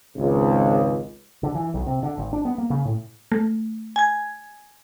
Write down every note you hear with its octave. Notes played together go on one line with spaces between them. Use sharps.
G#1 C#2
D3
E3
B1
C3
D3
G#1
D4
B3
A#3
C#3
A2
A3
G#5 G#6